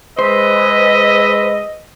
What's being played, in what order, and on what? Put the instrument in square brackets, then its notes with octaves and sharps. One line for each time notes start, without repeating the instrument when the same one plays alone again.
[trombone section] G#3 B4 [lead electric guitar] C5 [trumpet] D#5 [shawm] E5